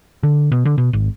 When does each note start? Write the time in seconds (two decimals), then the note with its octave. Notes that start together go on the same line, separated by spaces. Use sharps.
0.23 D3
0.52 B2
0.65 D3
0.78 B2
0.93 G#1